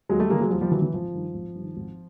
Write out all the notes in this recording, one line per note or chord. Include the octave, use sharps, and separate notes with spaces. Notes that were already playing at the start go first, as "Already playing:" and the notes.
D#2 F#3 G#3
G3 A3
C#3 E3 G#3 A#3
F#3 G#3
D#2 F3 G3
F3 G3
C#3 E3 F#3
E3
G#1 F3
G2 D#3
G#1
G2
D#3
G#1